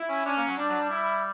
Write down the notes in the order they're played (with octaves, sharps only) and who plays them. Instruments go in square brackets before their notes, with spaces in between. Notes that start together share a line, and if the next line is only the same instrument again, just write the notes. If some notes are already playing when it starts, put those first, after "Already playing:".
Already playing: [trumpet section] E4
[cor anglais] C#4
[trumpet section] C#4 [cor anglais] D4
[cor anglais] A#3
F#3
[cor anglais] G3 [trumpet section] D4
[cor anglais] F#3
G3
[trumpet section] E4